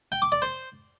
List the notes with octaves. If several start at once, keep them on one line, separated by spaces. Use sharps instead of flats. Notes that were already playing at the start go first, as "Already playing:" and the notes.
G5
D6
D5
C5